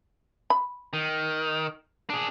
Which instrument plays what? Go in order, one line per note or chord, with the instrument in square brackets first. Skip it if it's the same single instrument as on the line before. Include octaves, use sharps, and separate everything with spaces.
[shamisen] B5
[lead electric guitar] D#3
D4 G#4